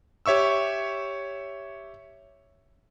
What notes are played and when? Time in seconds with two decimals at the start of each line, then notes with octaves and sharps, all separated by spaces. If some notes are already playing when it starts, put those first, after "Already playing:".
0.26 G4 C#5 E5 C#6 E6